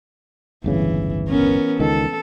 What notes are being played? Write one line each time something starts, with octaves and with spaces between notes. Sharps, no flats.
D1 G1 C#3 E3
B3 C#4 A#4
C#2 D#3 A4